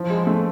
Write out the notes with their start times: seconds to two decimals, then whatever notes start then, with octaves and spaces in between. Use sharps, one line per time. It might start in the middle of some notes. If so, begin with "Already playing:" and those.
Already playing: F3
0.10 G#3
0.27 A3